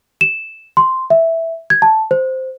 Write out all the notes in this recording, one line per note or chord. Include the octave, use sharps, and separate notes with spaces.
E7
C6
E5
G#6
A5
C5